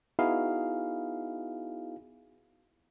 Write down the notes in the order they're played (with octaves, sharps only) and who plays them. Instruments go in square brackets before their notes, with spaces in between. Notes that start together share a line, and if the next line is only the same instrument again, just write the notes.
[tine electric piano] B3 D#4 E4 F#4 G#4 F5